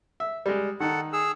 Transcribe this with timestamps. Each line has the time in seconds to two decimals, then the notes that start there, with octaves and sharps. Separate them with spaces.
0.20 E5
0.46 G3 G#3
0.80 D#3 D#4 A4 F#5
1.13 G#4 E6